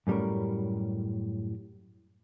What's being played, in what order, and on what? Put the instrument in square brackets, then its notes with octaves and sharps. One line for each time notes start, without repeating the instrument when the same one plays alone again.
[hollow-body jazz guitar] F#2 A2 G3 C#4 A#4